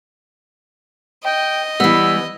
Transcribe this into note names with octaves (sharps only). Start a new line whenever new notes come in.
D#5 G5
E3 G3 B3 E6